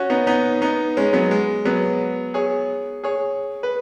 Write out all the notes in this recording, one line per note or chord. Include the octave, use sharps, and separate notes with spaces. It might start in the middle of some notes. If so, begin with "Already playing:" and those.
Already playing: C#4 F#4
B3 D#4
B3 D#4
B3 D#4
G#3 C#4
F#3 B3
G#3
F#3 B3
G#4 C#5
G#4 C#5
B4